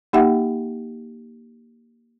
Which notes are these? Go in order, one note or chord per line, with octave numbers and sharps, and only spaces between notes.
A#3 D#4 G4 E5 F#5